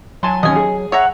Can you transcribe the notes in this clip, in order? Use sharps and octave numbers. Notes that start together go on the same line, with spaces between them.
F#3 G#5 A5 C6
D#2 C#4 D#5 G#5
G#4
C#5 E5 F#5 A#5